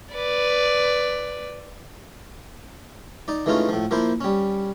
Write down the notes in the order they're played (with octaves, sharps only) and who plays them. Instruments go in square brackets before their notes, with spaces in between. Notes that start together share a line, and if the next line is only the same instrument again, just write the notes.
[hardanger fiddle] B4 D5
[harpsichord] D#4 D5
E3 G#3 A3 C#4 D#4 F4
A2 F3
F3 A#3 E4 C5
G3 C#4